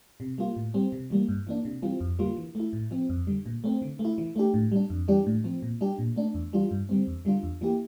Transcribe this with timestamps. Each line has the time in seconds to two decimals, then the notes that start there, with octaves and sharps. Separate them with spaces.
0.20 C3
0.38 G3 A#3 F4
0.56 A2
0.74 G3 C4
0.92 C3
1.10 E3 G3 A#3
1.28 G2
1.47 E3 A#3 D4
1.65 C3
1.82 E3 G3 C4 F4
2.00 F2
2.19 D3 G3 A#3 F4
2.37 E3
2.55 A3 E4
2.73 A2
2.91 F3 C4
3.09 F2
3.27 D3 G3
3.46 A#2
3.64 A3 C4
3.82 D3
3.99 A3
4.05 E4
4.18 E3
4.36 A3 D4 G4
4.54 A2
4.72 G3 D4
4.90 F2
5.08 E3 G3 D4 G4
5.26 A2
5.44 F3 C4
5.62 A#2
5.81 G3 D4 G4
5.99 A#2
6.16 A3 D4
6.34 E2
6.53 E3 G3 D4 F4
6.71 G2
6.89 D3 G3 C4
7.07 E2
7.25 D3 G3 D4 F4
7.43 E2
7.61 E3 A#3 E4 G4